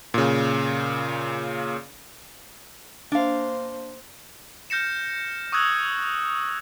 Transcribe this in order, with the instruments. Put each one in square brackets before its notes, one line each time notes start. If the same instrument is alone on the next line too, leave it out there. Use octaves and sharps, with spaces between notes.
[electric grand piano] A#2 C#3
[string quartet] A#3 C5 [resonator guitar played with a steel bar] D4 F5
[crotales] F6 G6 A#6 C#7 E7
C#6 D#6 E6 F#6 G#6 F#7